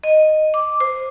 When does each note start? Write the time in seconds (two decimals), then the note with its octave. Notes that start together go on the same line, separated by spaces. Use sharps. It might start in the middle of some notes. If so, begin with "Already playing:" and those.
0.04 D#5
0.54 D6
0.80 C5